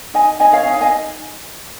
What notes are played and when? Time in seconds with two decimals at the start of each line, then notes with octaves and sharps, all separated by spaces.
0.14 D#4 D#5 G#5
0.40 D#4 D#5 G#5
0.53 C#5 F5
0.66 D#4 G#5
0.73 F5
0.81 D#5 G#5